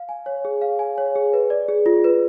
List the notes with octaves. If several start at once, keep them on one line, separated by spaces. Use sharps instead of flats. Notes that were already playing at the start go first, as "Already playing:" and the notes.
Already playing: F5
G#5
C#5
G#4
F5
G#5
C#5
G#4
B4
D5
G#4
F4
B4